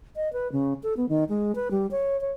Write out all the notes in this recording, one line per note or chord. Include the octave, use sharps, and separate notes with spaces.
D#5
B4
C#3
A4
B3
D#3
G#3
B4
G3
C#5
C#5